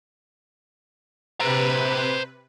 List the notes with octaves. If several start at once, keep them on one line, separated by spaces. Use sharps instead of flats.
C3 B4 C5 A#5